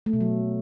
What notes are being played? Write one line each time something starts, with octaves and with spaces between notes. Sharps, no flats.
A3
B2
F#3